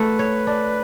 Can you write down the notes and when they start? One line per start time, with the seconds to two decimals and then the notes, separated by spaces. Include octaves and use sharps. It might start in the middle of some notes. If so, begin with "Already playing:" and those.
Already playing: A3 F#4 B4
0.19 C#5
0.47 D4